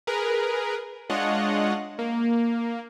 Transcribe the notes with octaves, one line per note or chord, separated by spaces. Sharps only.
G#4 A#4 B4
G#3 D4 F4 C#5 D#5 F#5
A#3